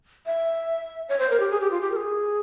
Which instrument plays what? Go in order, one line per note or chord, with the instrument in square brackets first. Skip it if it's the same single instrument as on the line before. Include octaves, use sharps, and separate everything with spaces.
[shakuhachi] E5
C#5
C5
A#4
G4
G#4
G4
F4
G4
A#4
G#4